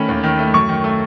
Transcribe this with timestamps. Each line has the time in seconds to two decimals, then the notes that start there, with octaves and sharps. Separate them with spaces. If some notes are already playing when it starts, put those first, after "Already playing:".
Already playing: D#3 A3 C#4 B5
0.09 D#2
0.23 D#3
0.39 A3
0.54 F#2 C#6
0.69 D#3
0.84 A3